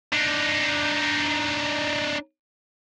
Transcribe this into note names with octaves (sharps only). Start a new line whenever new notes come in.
D4 D#4